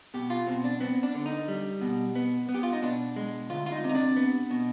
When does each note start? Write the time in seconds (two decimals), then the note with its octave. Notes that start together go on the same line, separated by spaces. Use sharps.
0.14 B2 G4
0.30 F4
0.47 B2 C4
0.64 D4
0.80 B3 C4
1.03 D4
1.15 D3
1.26 D#4
1.48 G3
1.81 B2
2.15 B3
2.49 B3
2.54 G4
2.63 F4
2.73 D#4
2.82 B2 D4
3.16 G#3
3.50 D2 F4
3.66 F4
3.72 D#4
3.84 C3
3.89 D#4
3.95 D4
4.16 B3
4.50 B2